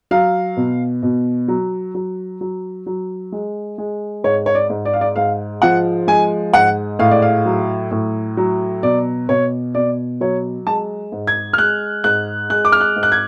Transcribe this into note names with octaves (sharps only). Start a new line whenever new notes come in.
F#3 F5
B2
B2
F#3
F#3
F#3
F#3
G#3
G#3
G#2 C#5
C#5
D5
G#2
D5
F5
D5
G#2 F5
F3 F#5
G#3 G#5
G#2 F#5
A2 F5
D5
F5
F#3
A2
F#3
B2 D5
B2 C#5
B2 D5
F#3 C#5
G#3 A5
G#2
G#6
F6
G#3 F#6
G#2 F#6
G#3 F#6
D6
F6
F#6
G#2
F#6
G#6